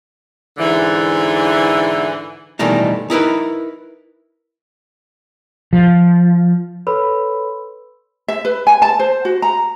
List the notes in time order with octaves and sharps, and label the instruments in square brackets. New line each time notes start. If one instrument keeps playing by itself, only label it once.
[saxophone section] G#2 D3 E3
[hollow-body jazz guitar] B2 D#3 E3 G3 A3 D#4
D#4 E4 A#4 B4
[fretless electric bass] F3
[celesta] A4 B4 C#5 B5 C6 E6
[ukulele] E5
B4
G#5
A5
C5
F#4
A#5